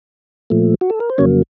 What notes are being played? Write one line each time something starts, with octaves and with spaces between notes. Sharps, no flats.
A#2 F3 A3
F#4
A4
A#4
C5
F2 C#3 F#3 A#3 C#4 C#5